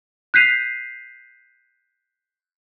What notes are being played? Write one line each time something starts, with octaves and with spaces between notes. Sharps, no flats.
F#6 G6 B6 C7 D#7 F7